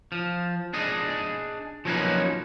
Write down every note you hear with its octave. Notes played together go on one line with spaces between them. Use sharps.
F3
D4 G#4 D#5
F3 F#3 A#3 C#4 D#4 B4